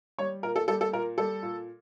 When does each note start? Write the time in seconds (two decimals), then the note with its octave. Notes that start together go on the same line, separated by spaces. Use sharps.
0.18 G3 C#5
0.43 A#2 A#4
0.56 A4
0.68 G3 A4
0.81 A4
0.93 A#2 A#4
1.18 G3 A4
1.43 A#2